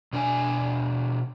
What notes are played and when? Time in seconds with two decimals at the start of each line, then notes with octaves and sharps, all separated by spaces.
0.13 B2 D4 B4 G#5